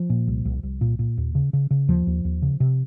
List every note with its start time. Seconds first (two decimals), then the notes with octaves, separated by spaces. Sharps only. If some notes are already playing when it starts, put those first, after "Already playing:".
Already playing: F3
0.10 A#2
0.27 C2
0.45 C2
0.63 C2
0.81 A#2
0.99 A#2
1.18 D#2
1.35 C#3
1.53 C#3
1.71 C#3
1.88 D#2 F3
2.07 D#2
2.25 D#2
2.42 C#3
2.60 C3